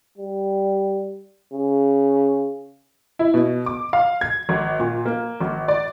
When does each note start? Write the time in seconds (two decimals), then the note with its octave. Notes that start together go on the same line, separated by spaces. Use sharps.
0.18 G3
1.53 C#3
3.19 E4
3.34 B2
3.66 D6
3.93 F5
4.21 G#6
4.49 G#1
4.80 A#2
5.06 A#3
5.40 G#1
5.68 D5